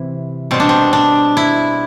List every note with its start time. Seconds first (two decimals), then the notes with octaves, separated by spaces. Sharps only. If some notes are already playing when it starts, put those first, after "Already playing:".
Already playing: C3 E3
0.51 B2 G3 C4
0.60 D4
0.69 C4
0.93 D4
1.37 E4